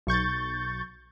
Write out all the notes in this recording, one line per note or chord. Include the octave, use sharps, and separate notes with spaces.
B1 C#6 G6 A6